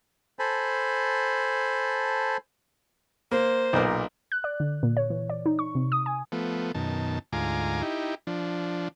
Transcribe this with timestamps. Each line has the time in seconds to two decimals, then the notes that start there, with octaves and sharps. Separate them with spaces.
0.39 A4 C5 G#5 A5 B5
3.31 A#3 C5
3.73 B1 A#2 A#4
4.32 F#6
4.44 D5
4.60 D3
4.83 A#2
4.97 C#5
5.10 E3
5.30 D5
5.46 D#4
5.59 C#6
5.75 C3
5.92 D#6
6.06 G#5
6.32 F3 A3 B3
6.75 F#2 B2 D#3 A5
7.33 D2 G#2 F4 G#5 A#5 D6
7.82 D#4 E4 G4
8.27 F3 D4